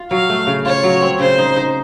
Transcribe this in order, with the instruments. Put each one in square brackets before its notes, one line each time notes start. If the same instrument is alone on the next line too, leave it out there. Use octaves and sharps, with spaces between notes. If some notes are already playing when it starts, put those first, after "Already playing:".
Already playing: [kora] F4
[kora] F#3 [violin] F5
[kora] A3
C#3
[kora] F4 [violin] C#5
[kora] F#3
C4
[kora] C#3 [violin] C5
[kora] D#4
D#4